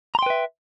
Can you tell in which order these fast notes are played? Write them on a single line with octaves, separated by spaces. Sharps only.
A#5 C6 G5 B4 E5